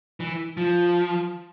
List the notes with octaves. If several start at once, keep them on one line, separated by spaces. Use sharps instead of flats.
E3
F3